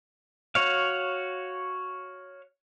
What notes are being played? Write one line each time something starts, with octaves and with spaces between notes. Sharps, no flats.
F#4 C#5 F5